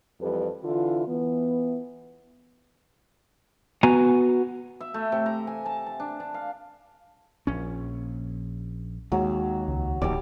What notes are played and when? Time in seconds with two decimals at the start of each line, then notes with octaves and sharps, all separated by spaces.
0.20 F2 E3 G3 G4 A4 B4
0.63 D3 E3 E4 F4
1.07 E3 B3
3.83 B3 F#4 B4 G#5 A#5
4.81 E5
4.94 A3
5.12 C3
5.26 A#5
5.47 G#5
5.66 A5
5.87 A5
6.00 D4
6.20 D4
6.34 F5
7.47 A#1 C#4
9.12 D#2 F#3 G#3
9.68 C#2
10.02 D1 A#1 D#2 G3 D5